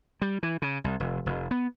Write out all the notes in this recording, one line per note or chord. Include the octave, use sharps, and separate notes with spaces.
G3
E3
C#3
C2
F1
F1
B3